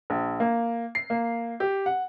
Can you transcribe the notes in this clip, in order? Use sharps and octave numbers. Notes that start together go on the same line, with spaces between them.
A#1
A#3
C7
A#3
G4
F#5